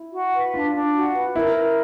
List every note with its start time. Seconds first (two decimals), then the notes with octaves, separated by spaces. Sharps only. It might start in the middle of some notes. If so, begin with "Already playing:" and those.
Already playing: E4
0.13 F#4
0.34 B4
0.54 D4 F4
0.75 D4
0.95 F#4
1.15 B4
1.36 E4 A#4
1.56 A#4